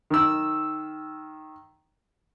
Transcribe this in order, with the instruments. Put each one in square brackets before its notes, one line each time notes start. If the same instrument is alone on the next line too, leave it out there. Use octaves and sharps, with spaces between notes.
[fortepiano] D#3 E6